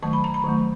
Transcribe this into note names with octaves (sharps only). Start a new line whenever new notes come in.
D#3 F#3 A3 A5
B5
A#5
B5
D#3 F#3 A3